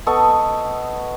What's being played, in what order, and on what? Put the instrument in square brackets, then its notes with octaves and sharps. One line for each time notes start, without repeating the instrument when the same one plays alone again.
[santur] B3 A4 D#5 C#6